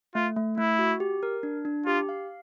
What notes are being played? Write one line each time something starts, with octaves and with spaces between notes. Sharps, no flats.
A3 F4
A3
A3 E4
F#4
G4
A#4
D4
D4
F4 G4
F5